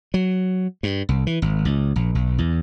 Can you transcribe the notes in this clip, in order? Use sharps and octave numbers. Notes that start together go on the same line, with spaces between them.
F#3
G2
C2
E3
G#1
C#2
A#1
B1
E2